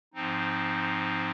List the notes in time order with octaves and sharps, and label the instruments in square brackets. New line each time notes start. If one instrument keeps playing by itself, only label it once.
[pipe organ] G#2 F3 C4 D#4